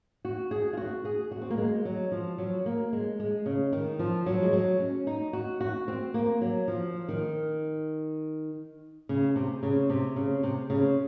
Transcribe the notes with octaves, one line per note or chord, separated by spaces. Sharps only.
F#4
G#4
F4
F#4
G#4
F#4
C4
A#3
G#3
F#3
F3
F#3
A#3
G#3
G#3
C#3
D#3
F3
F#3
G#3
F#3
C#4
D#4
F#4
F#4
C4
A#3
F#3
F3
D#3
C#3
C3
C#3
C3
C#3
C3
C#3